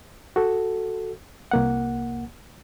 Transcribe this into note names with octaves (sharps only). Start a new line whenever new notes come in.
F#4 A4
C2 A#3 F#5